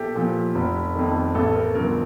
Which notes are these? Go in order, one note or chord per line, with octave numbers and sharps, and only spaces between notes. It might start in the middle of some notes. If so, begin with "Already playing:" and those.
Already playing: A#1 G4 A4
A#2 F3
F1
F2 D#3
A1 A4
A#4
G2 D3 F3 A#4